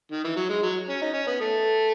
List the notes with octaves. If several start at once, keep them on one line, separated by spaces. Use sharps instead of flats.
D#3
E3
F#3
G#3
F#3
C#4
D#4
C#4
B3
A3